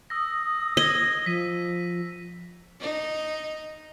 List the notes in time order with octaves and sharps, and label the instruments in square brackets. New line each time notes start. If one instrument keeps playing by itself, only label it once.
[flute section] D#6 [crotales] E6 A#6
[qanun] D#5 [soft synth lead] G#6
[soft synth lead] F3 [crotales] B6 D#7
[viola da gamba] D#4